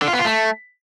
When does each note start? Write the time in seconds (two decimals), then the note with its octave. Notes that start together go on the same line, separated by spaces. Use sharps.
0.02 D3
0.08 F4
0.13 B3
0.19 F4
0.25 A3